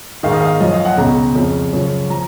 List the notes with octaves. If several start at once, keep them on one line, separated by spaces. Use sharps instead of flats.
G#2 D#3 F5
D#5
F5
F#2 F3 D#5
F5
F#5
C#2 B2 A#5
F2 C#3 F3
F#2 C#3 F3
F3 A#5